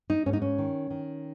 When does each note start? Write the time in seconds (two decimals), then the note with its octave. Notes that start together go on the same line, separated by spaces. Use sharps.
0.10 D#4
0.26 G#2 C#4
0.33 D#4
0.42 C#4
0.58 D#3
0.90 D#3